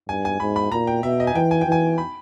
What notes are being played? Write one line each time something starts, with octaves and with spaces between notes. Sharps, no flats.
G2 G#5
G#5
G#2 B5
B5
A#2 A#5
G5
B2 E5
D#5
G#5
E3 G5
G#5
G5
E3
G#5
B5